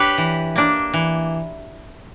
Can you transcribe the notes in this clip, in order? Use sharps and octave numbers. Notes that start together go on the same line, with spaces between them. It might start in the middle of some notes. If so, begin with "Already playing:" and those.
Already playing: D4 G4 B4 C#5
E3
A#3 D4
E3